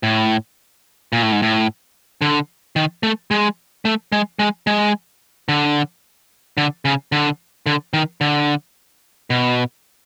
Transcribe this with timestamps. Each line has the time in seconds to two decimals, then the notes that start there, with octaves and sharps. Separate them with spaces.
0.03 A2
1.13 A#2
1.22 A2
1.32 G#2
1.42 A2
2.22 D3
2.76 D#3
3.03 A3
3.31 G#3
3.85 A3
4.12 G#3
4.39 G#3
4.67 G#3
5.49 D3
6.57 D3
6.85 C#3
7.12 D3
7.66 D3
7.93 D#3
8.21 D3
9.30 B2